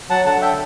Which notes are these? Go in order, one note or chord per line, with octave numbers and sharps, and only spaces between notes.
F#3 F#5 A5
D3 F#5 A5
E5 G5